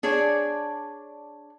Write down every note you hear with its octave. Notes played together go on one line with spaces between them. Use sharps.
D4 G#4 C#5 D5